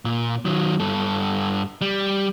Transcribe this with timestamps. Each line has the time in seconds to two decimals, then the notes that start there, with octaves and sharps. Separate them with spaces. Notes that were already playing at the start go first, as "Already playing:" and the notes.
0.05 A#2
0.45 D#3 F#3
0.80 G2 A4
1.81 G3